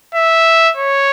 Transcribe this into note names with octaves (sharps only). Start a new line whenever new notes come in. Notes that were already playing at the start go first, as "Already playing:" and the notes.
E5
C#5